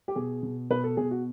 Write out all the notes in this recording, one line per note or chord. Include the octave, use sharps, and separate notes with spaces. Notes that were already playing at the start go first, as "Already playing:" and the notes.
G4
B2 G#4
B2
B2 B4
A4
B2 G#4
F#4